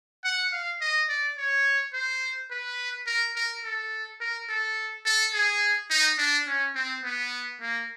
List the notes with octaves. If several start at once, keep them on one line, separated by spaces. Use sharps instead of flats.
F#5
F5
D#5
D5
C#5
C5
B4
A#4
A#4
A4
A#4
A4
A4
G#4
D#4
D4
C#4
C4
B3
A#3